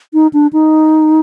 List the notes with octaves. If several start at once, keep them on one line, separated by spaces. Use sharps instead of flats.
D#4
D4
D#4